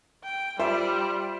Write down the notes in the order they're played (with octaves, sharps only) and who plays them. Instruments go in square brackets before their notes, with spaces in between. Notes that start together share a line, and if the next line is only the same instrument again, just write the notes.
[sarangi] G5
[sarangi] G3 [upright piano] F4 C5 E5